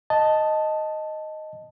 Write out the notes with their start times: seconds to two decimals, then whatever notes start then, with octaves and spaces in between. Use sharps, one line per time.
0.10 D#5 A5